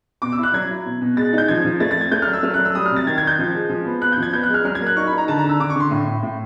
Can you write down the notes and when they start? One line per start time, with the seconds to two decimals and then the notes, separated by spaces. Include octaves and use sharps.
0.22 B2 D6
0.32 E6
0.38 E4
0.43 F#6
0.54 F#3 G#6
0.70 E4
0.86 B2
1.01 B2
1.16 G#3 A6
1.33 D#4
1.38 G6
1.48 F3 G#6
1.65 F3
1.80 A3 A6
1.91 A6
1.96 C4 G#6
2.12 A3 G6
2.22 F6
2.27 F#3
2.33 E6
2.43 A3 F6
2.54 F#6
2.59 F#3
2.65 E6
2.75 G3 D#6
2.86 F6
2.91 C3
2.96 A6
3.07 D#3 G#6
3.18 G#6
3.22 D#3
3.27 G6
3.39 F3
3.54 G#3
3.69 F3
3.86 B3
4.01 B3 F#6
4.12 G6
4.18 F3 G#6
4.33 B3 G6
4.43 F#6
4.49 G#3
4.54 F6
4.65 F#3 F6
4.75 G#6
4.81 A#3
4.86 F#6
4.97 D#4 C#6
5.07 B5
5.13 D#4
5.18 A#5
5.28 D3 A5
5.38 A#5
5.44 D3 E6
5.60 D3 D6
5.70 C#6
5.76 D3 C6
5.91 A2
6.07 A2
6.23 A2